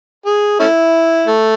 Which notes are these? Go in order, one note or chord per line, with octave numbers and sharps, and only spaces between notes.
G#4
A3 C#4 E4
A3